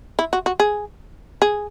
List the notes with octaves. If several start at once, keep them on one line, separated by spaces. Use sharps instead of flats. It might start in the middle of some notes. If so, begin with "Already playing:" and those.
E4
F#4
F#4
G#4
G#4